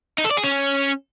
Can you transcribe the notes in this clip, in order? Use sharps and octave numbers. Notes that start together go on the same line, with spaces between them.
D#4
A4
D5
G#4
C#4